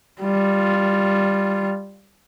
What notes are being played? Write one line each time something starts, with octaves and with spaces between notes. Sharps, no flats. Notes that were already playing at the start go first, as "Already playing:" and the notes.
G3 F4